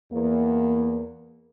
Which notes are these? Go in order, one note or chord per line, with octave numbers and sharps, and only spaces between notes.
E2 A#3